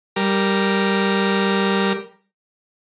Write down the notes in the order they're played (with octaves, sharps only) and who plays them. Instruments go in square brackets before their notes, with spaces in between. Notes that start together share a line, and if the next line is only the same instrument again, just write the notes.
[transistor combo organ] G3 A#4